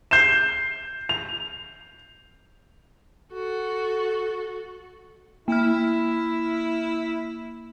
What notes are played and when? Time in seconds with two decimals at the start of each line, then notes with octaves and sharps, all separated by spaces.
0.11 G6 C7 E7
1.09 F7
3.32 F#4 A4
5.48 A#3 E4 F6